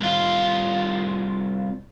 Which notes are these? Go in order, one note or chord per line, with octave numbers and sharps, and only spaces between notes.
C2 F4